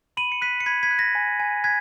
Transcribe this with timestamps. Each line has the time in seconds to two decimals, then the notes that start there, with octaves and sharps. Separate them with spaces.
0.17 B5 D#7 F#7
0.32 C#7
0.42 F#6 B6 D#7
0.60 C#7
0.66 B5 G#6 B6
0.83 G#6 B6
0.91 F#6
0.99 A#6
1.15 G#5
1.40 G#5
1.64 F#6 G#6 B6